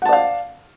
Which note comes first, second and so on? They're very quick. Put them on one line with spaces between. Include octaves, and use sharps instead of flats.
F#5 A5 D5 F5